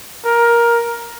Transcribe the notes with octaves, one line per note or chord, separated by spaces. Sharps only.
A#4